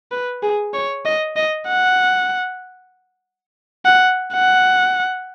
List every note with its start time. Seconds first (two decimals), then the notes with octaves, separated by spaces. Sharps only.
0.12 B4
0.43 G#4
0.74 C#5
1.05 D#5
1.36 D#5
1.68 F#5
3.85 F#5
4.33 F#5